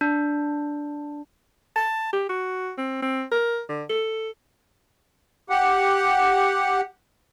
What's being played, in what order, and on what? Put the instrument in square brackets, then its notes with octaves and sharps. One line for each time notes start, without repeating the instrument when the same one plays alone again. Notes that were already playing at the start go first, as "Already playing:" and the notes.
[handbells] D4
[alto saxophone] A5
G4
F#4
C4
C4
A#4
D3
A4
[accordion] G4 F#5